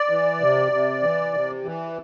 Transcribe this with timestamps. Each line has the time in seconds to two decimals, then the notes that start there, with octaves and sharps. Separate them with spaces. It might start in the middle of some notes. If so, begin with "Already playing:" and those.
Already playing: D5
0.09 E3
0.41 C3
0.72 C3
1.03 E3
1.34 C3
1.65 E3